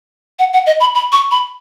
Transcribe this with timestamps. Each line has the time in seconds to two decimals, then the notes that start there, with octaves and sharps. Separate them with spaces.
0.39 F#5
0.53 F#5
0.67 D#5
0.80 B5
0.95 B5
1.12 C#6
1.31 B5